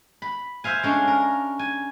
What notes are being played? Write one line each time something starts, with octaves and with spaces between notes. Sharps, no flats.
B5
C5 E5 F5 G#5
G#3 C#4 D4
A#4
G#5